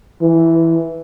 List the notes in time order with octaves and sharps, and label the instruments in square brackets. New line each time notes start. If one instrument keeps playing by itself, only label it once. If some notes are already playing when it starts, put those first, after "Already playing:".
[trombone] E3